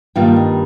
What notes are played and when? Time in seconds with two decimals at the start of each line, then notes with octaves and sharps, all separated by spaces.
0.16 G2 D#3 G3 A#3 F4 G5
0.36 D#5